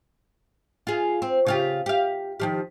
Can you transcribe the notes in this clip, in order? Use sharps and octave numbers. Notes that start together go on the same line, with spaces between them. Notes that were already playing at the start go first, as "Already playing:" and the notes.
F4 G#4
C4
C#3 F4 G4
G4 F5
D#3 F3 G4